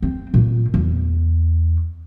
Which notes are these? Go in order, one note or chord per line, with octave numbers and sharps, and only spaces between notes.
C4
A#2
E2